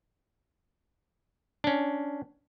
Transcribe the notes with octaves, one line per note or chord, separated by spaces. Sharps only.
C#4 D4